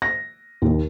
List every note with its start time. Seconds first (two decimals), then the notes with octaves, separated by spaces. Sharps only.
0.02 A#6
0.62 D#2